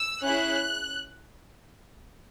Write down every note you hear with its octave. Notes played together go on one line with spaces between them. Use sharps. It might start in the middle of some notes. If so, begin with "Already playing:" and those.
Already playing: E6
C#4 E4 G#4 F#6